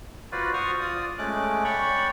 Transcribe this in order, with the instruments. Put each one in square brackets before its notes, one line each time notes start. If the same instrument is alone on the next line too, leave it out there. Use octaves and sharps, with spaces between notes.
[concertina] F4 F#4 B4 C5 D5
F#4 C5 C#6 D#6 F6
F4 D5 D#6
G#3 A3 C#4 D6 F#6
C#5 D5 F#5 G5 B5 C#6